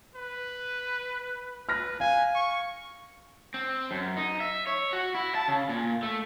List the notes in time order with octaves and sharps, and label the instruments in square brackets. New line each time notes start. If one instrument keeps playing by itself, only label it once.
[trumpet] B4
[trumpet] B4 [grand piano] F6 A#6
[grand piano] F5 [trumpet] G#5
[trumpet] C#6
[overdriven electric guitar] C4
F#2
D#4
E5
C#5
F#4
E4
A5
C#3
A#2
A3